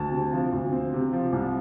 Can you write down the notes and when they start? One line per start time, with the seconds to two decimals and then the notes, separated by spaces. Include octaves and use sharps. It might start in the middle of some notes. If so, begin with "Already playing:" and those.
Already playing: D2 A5
0.12 C3
0.33 F3
0.52 D2
0.72 C4
0.93 C3
1.13 F3
1.33 C2